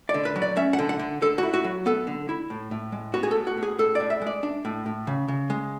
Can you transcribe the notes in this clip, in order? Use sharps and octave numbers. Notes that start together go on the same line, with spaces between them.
D5
D3
B4
F#3
D5
C#4 E5
F#5
D3
F#5
D3
D3 A4
E4 F#4
F#4
F#3
B3 A4
D3
E4
A2
A2
G#3
B3 F#4
G#4
A2 A4
F#4
A2
G#4
A2 A4
A2 D5
E5
G#3 D5
D4
A2
A2
C#3
C#3
G#3